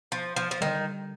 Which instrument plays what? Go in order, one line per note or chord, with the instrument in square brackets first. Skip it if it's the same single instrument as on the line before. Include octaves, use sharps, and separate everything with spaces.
[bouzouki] F3
F3
F3
[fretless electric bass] D3 G3 [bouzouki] D#3